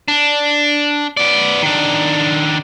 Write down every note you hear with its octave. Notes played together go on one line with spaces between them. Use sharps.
D4
B3 D5
D#3 D4